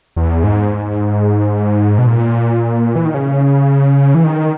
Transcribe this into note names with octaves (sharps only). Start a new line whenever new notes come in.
E2
G#2
B2
A#2
E3
D#3
C#3
E3
D#3